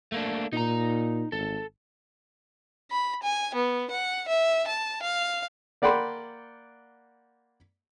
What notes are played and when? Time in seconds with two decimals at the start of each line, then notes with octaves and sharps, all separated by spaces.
0.12 A3 A#3 D4
0.53 A#2 D#4 A#5
1.32 G#1 A4
2.91 B5
3.23 G#5
3.55 B3
3.91 F#5
4.28 E5
4.68 A5
5.03 F5
5.82 A#3 D5 F#5 G5 B5 C6